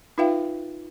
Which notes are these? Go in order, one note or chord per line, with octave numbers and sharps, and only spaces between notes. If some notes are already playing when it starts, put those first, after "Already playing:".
D#4 F4 B4 E5 F5 G5